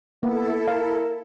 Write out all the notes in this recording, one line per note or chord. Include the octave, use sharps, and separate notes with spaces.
A#3 B3 E4 A4
A#4 F5